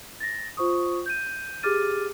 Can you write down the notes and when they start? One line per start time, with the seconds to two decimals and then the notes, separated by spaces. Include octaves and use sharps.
0.20 A6 A#6
0.57 F4 C5 C#6 D#6
1.06 G6 D#7
1.63 G4 G#4 D6 F6 A6 D#7